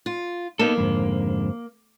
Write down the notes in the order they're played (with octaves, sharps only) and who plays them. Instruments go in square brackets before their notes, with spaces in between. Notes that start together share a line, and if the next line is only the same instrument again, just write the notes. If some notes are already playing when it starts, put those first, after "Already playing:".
[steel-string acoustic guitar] F4
[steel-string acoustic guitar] A#3 [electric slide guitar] B3 D#4 A4
[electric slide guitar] F2 G#2 D3